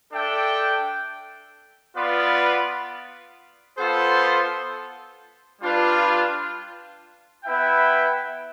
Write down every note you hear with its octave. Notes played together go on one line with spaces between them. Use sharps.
D4 A4 E5 G5
B3 F4 B4 D5 F5
B3 F4 A4 C5
G3 D4 F4 B4
B3 E4 B4 E5 G5